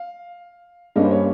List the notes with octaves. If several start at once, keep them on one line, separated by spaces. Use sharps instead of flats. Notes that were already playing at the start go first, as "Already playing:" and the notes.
Already playing: F5
G2 G3 A#3 C#4 D#5
C5
C#5